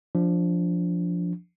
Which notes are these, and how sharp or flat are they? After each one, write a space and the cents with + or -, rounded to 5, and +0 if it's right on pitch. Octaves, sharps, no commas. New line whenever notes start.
F3 +0 D4 -15